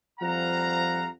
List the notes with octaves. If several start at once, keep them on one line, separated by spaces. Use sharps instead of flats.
F2 F3 G3 F5 F#5 A#5